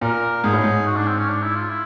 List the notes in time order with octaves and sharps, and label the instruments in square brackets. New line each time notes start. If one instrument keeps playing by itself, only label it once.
[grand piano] A#2 [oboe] A#4
[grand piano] G#2 [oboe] G#4
[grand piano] A2
G#2
[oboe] F#4
D4
C4
C#4
D4
E4
F4
E4